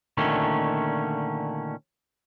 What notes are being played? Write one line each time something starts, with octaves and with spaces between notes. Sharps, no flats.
A#2 D3 D#3 A3 C#4